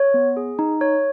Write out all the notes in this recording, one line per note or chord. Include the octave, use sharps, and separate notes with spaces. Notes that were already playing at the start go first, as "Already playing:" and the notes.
Already playing: C#5
B3
G#4
D#4
C#5